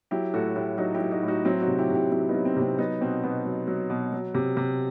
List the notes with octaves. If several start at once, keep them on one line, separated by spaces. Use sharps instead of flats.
F#3 E4 G4
A2 F#4 A4
A2 E4 G4
F#3 D#4 F#4
E4 G4
F#3
D#4 F#4
A2
D#4 F#4
F#3 C4 E4
D#4 F#4
C3
E4 G4
C3 E4 G4
F#3 C4 E4
B3 D#4
F#3
C4
C3
C4
F#3 B3 D#4
B2 C4
B2 B3
F#3
F#3
B2
F#3
C3
C3